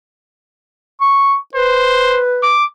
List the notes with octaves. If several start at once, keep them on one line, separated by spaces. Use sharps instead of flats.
C#6
B4 C5
D6